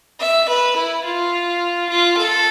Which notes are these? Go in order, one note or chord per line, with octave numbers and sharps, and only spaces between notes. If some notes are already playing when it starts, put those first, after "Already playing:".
E5
B4
E4
F4
F4
A4